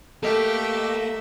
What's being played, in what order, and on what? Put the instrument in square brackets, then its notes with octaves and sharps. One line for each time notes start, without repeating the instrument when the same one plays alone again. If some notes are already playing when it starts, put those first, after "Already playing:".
[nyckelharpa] A3 E5 [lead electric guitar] A#3 [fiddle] G4 [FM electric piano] A4 D#5